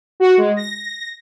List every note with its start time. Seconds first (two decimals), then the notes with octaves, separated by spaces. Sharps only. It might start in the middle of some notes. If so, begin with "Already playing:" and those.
0.20 F#4
0.37 G#3
0.56 A#6